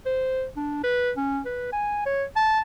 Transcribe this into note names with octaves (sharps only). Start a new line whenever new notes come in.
C5
D4
B4
C#4
B4
G#5
C#5
A5